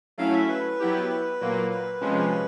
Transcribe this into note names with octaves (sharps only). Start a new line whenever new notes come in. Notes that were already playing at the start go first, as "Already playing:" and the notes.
F#3 A3 C#4 E4 F5
E5
B4
F#3 B3 E4 G4
A#2 F#3 A#3
B4
C3 F3 G#3 C#4